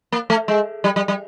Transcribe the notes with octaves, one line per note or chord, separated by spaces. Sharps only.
A#3
A3
G#3
G3
G3
G3